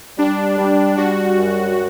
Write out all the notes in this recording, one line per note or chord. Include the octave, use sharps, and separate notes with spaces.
G3 D4
G3
G3 F#4
F#2